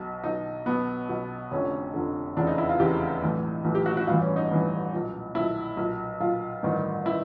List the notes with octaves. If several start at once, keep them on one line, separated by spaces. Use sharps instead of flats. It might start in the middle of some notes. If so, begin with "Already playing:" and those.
Already playing: B1 B2
B1 B2 D#4
B1 B2 B3
B1 B2
F1 F2 D3 C#4
F1 F2 D3
F1 E2 C#3 D4
D#4
E4
F4
F1 E2 C#3 G4
B1 A2 E3
B1 A2 E3
G4
F#4
F#4
A1 G2 E3 F4
C#4
D#4
A1 G2 E3
B1 A#2
B1 A#2 E4
B1 A#2
B1 A#2 F4
A1 G2 D#3
D#3 E4